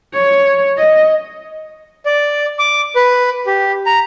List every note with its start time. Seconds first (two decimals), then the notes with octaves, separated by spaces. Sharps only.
0.14 C#5
0.77 D#5
2.06 D5
2.59 D6
2.96 B4
3.46 G4
3.86 A#5